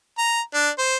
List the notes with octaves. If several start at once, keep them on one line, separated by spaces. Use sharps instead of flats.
A#5
D4
C5